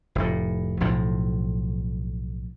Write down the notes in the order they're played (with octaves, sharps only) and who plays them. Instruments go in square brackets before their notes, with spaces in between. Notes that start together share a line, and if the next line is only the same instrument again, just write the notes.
[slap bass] F1 A2
B1 A2 F3